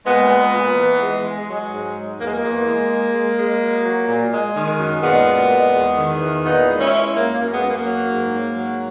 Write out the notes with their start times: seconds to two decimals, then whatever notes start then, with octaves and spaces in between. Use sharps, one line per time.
0.06 A#2 G#3 B3
0.30 G#3
0.54 A#2
0.77 E3
1.01 G#3
1.24 G#3
1.48 F#3 G#3
1.72 G#2
1.96 F#3
2.19 E2 A#3
2.26 G#3
2.33 A#3
2.43 E2
2.66 G#3
2.90 G#3
3.14 G#3
3.37 G#3
3.61 F#3
3.85 F#3
4.08 A#2
4.31 G#3
4.55 D#3
4.79 F#2
5.03 A#2 G#3 B3
5.26 A#2
5.50 G#3
5.74 E2
5.97 D#3
6.21 E2
6.45 A#2 B3 D#4
6.68 G#3
6.80 C#4 E4
6.92 G#3
7.16 F#2 A#3
7.34 A#3
7.40 F#2
7.50 G#3 B3
7.63 F#2
7.68 A#3
7.86 F#3
8.11 G#2
8.34 G#2
8.57 F#3